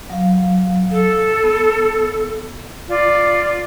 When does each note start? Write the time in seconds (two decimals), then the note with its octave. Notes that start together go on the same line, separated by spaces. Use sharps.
0.10 F#3 F5
0.92 A4
1.44 B3
2.88 F4 D5